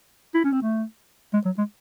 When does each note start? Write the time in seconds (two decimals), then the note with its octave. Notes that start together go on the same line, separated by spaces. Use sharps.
0.34 E4
0.44 C#4
0.52 C4
0.62 A3
1.33 G#3
1.45 F#3
1.58 G#3